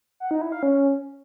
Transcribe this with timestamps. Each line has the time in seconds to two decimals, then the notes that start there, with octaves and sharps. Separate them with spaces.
0.20 F#5
0.31 D#4
0.41 E4
0.52 F5
0.63 C#4